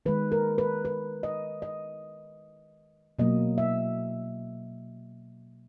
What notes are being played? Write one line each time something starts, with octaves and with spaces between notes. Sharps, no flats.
D#3 G#3 B4
A#4
B4
B4
D#5
D#5
B2 F#3 A#3 D#5
E5